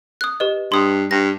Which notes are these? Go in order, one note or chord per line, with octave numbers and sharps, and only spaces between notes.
D#6 F#6
G4 B4 D#5
G2 C6 D#6
G2 A#6